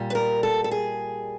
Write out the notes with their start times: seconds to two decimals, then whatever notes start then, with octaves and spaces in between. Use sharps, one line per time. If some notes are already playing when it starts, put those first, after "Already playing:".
Already playing: A#2 G3
0.10 B4
0.15 A#4
0.43 A4
0.64 A4
0.71 G#4